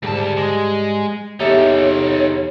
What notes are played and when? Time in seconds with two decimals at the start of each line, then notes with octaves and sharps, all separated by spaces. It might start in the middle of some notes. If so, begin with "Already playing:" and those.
0.03 D2 G#2 G3 A5
0.37 G#3
1.40 E2 D#4 G4 A4 C#5 E5